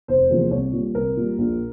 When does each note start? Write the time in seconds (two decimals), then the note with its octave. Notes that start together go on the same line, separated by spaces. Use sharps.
0.08 F1 C5
0.30 E2 C3 F3 A#3
0.51 C2 C#5
0.72 A#2 G3
0.95 C2 A#4
1.16 A#2 G3
1.38 A#1